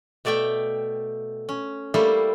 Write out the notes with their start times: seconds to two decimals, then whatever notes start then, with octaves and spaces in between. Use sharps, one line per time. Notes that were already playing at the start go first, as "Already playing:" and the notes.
0.25 B2 A3 D5 E5 G5
1.49 C#4
1.94 G3 A3 A#3 E4 A4 C5